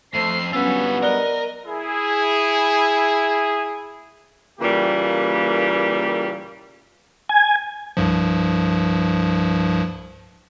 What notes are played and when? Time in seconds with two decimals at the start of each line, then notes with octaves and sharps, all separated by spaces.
0.14 F2 A3 C5 C7
0.53 G2 F#3 B3 C#4 F4 B4 E6
1.03 A#4 D5 D#5 F#6 G7
1.66 E4 G#4
4.60 A#2 C#3 E3 G3 A#3 G4
7.29 G#5
7.97 C2 G2 F3